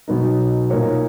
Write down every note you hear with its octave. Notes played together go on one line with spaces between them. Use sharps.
B2 F#3 B3 D#4
A#2 A#3 D#4 A#4 C#5